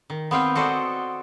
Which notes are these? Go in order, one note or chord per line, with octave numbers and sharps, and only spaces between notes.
D#3
B3 C4 F5 G5
F#4 A4 C5 D5 D#5